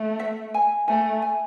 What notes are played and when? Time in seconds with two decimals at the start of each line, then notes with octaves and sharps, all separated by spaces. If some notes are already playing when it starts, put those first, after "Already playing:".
Already playing: A3
0.19 E5
0.54 G#5
0.88 A3 G#5
1.22 G#5